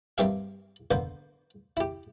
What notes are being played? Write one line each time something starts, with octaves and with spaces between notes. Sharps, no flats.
G2 A#3 C4 G4 E5 F5
D3 A#3 B3 C5
E4 G4